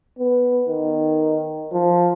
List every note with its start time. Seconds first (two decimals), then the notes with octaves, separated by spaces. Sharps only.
0.19 B3
0.68 D#3
1.72 F3